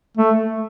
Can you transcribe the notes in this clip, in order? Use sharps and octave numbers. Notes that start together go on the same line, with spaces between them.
A3